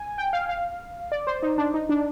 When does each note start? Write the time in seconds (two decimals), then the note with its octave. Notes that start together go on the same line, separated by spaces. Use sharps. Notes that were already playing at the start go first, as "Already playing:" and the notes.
Already playing: G#5
0.18 G5
0.33 F5
0.49 F5
1.12 D5
1.27 C5
1.43 D#4
1.58 D4
1.74 D#4
1.89 D4